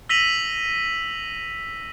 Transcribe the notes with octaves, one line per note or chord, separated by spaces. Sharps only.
E6 A#6 B6 D#7 F7 F#7